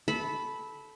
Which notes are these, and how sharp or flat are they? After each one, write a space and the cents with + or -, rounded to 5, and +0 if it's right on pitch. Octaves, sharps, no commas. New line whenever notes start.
A4 -20 B5 +0